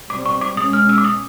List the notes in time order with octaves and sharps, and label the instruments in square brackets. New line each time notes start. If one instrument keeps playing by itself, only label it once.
[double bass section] B2 G3 C4 [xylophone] D6
[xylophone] C#6
D6
[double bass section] B2 G#3 C#4 [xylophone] D#6
[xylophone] F6
E6
D6
D#6